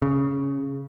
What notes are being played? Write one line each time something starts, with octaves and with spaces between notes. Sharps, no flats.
C#3